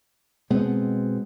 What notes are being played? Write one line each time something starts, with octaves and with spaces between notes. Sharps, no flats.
B2 G#3 B3 C4